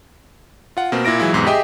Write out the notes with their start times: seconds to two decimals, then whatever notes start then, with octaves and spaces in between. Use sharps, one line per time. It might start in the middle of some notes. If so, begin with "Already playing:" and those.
0.77 F4 F#5
0.92 B2 A#3 C4
1.05 A#2 E4 A#6 D7
1.19 E3 F#3 G#3 E4 F4
1.33 E2 G#2 C3 B3
1.46 G4 G#4 D#5 E5 G5